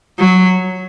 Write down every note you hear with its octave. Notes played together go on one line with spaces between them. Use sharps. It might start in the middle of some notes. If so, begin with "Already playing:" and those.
F#3